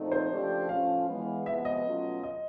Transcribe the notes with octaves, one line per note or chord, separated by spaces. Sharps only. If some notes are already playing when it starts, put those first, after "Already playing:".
Already playing: A#2 F3 A3 C4 D#4
C5
C#3 F3 A3 D4 G4
A2 F3 A3 C#4 F4 F5
E3 G#3 B3
C3 F3 G#3 B3 E5
D#5
B2 F#3 A3 C#4 F4
D#5